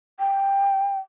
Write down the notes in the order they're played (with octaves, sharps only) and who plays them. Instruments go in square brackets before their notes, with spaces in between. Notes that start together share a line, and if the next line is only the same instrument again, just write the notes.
[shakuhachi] G5